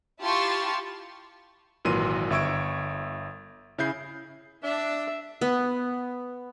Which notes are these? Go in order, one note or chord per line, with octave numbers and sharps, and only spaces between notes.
E4 F4 G4 A5 C6 C#6
G#1 A#2 E3 F#3 C6 D#7
G1 E5 C#6 E6 G#6 D7
C#3 E4 G#4 G6 C7
D4 E5
B3